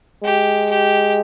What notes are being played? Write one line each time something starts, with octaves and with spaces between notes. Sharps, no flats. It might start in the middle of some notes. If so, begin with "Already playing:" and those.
G#3 G4
G4